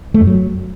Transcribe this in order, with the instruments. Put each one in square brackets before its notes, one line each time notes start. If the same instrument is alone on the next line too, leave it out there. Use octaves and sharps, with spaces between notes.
[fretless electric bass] A3
F#2
F#3